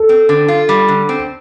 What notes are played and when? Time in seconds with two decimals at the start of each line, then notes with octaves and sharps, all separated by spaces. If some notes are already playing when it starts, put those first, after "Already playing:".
Already playing: A4
0.09 C4
0.29 D3
0.48 F4
0.69 G3
0.88 D3
1.09 C4